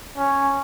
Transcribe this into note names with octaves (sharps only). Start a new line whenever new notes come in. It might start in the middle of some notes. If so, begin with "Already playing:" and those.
C#4